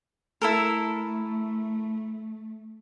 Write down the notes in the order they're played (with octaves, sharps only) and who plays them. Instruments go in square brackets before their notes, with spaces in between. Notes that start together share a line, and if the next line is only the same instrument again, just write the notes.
[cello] A3 [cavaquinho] E4 A4 A#4